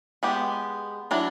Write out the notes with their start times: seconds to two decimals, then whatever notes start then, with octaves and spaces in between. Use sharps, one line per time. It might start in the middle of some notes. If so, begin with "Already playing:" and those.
0.23 G#3 B3 G4
1.11 F#3 D4 E4